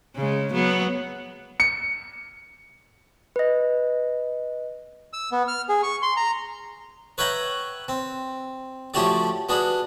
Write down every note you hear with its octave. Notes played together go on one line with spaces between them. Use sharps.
C#3 G#3
F#3 B3
C#7
B4 D#5
E6
B3
F6
G#4
C#6
C6
A#5
B4 C#5 E5 F#5 G5 A#5
C4
F3 A3 C#4 F#4 G4 D5
B3 D4 F#4 G#4